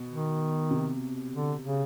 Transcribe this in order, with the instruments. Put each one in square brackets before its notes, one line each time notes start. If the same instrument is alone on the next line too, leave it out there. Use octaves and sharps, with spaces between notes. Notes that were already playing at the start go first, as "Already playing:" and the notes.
Already playing: [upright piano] B2
[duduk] D#3
[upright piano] C3
[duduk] D3
C#3